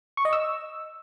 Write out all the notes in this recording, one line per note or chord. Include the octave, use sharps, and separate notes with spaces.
C#6
D#5
E6